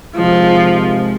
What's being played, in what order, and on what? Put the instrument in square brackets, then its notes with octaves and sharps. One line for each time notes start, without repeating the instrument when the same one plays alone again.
[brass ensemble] C3 D#3 G#3 [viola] F3